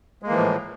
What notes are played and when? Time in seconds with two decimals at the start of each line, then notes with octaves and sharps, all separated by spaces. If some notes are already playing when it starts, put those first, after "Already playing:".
0.22 G#3
0.26 A#3
0.30 E3
0.34 F3
0.38 A2